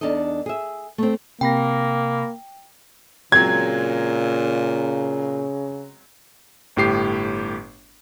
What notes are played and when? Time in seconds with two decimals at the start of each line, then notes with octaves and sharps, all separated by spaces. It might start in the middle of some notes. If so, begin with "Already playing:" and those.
0.01 E2 D4 D#4 A4 D#5
0.46 G#4 E5
0.98 A3 C4
1.41 C3 A#3 G5 B5 A#6
3.32 A#2 C#3 F#3 G#3 C4 G#6
6.76 G1 A2 G4 C7